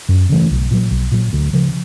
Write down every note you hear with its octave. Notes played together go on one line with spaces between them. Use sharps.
F#2
C#3 E3 A3
B1
A#2 F#3
B1
A#2 F#3
D2
C#3 F3